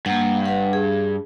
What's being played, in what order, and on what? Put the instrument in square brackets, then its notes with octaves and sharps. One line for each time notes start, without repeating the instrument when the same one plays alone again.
[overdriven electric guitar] G2 [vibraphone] A#3 F#5
[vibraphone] B4 F#5
G#4